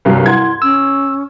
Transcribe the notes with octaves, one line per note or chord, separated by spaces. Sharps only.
C2 G2 F#3
E4 F#5 C6 G#6
C#4 E6